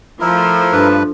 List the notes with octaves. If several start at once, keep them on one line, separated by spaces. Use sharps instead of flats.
F3 A3 E4 A#4
G2 D4 A4 B4 A6